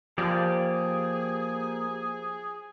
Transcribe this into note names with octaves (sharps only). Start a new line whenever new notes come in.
F3 A#3 G4 G#4 D5